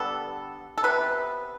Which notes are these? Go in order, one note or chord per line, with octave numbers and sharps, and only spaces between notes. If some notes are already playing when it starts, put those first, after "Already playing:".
Already playing: D3 G3 B3 A4
A4
C3 G3 B3 B4